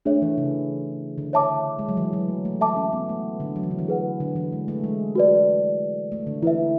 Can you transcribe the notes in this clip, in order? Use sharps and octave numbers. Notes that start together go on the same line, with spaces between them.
A3 D4 G#4 C#5 E5
E3
C#3
D3
C#5 E5 A5 D6
G#3
F#3
E3
F#3
A3
A3
A4 E5 A5 D6
C#4
B3
A3
D3
F#3
E3
D3
E3
G#4 B4 F#5
D3
E3
G#3
A3
G#3
F#4 B4 D5
A3
D3
E3 E4 B4 E5